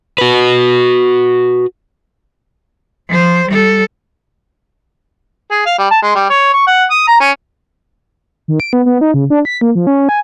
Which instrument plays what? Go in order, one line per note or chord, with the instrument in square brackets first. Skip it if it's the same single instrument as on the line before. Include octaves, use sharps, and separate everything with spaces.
[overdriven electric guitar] F#4 B4
[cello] F3 C5
G3 A4
[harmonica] G#4
F5
G3
A5
G#3
G3
C#5
C#6
F#5
D#6
A#5
C#4
[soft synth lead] D#3
D7
B3
B3
D#4
C#3
D4
B6
A#3
F3
C#4
G#5